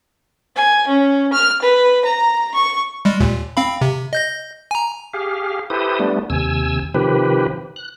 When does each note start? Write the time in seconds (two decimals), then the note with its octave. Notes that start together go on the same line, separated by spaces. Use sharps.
0.56 G#5
0.88 C#4
1.33 F6
1.62 B4
2.05 A#5
2.55 C#6
3.05 G3 G#3
3.20 D#2 A#2
3.57 C4 F5 B5
3.81 C3
4.13 D#5 G6 A#6
4.71 G#5 A#5
5.13 G4 G#4 F5
5.70 E4 G4 A4 B4 C5 D#6
6.00 G3 A3 B3 D4
6.30 D#2 C3 G#5 E6
6.94 C3 D#3 F3 G4 B4
7.76 F#6